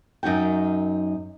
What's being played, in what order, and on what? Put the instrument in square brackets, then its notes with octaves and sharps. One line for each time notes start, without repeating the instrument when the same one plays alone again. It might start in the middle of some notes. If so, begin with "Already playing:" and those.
[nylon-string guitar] F#2 D#4 F#4 G5